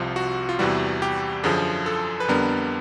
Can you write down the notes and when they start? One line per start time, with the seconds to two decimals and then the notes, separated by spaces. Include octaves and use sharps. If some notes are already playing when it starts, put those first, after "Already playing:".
Already playing: C2 C3 F3 F4
0.16 F#4
0.49 F4
0.59 E2 C3 E3 G3 F#4
1.02 G4
1.44 F#2 D3 F3 G#4
1.86 A4
2.20 B4
2.28 F2 D3 G3 B3 D4 A#4